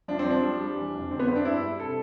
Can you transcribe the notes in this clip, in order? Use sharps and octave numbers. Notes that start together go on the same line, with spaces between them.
F3 D4
C4
F3
D4
G3
G3
E3
F2
D3 C4
B3
G2 C4
D4
G3 E4
G3
C3 A4